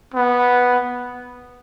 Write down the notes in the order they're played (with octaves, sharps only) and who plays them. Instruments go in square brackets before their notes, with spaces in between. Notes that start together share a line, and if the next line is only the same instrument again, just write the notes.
[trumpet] B3